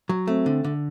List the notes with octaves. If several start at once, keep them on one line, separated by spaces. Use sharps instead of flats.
F#3
A3 C4
D3
D3